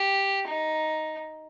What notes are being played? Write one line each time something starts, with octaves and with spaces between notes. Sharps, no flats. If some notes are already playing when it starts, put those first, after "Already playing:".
Already playing: G4
D#4